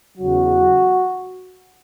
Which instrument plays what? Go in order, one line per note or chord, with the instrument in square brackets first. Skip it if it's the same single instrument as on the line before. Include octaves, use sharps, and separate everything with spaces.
[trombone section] E2 C#3 F#3 F#4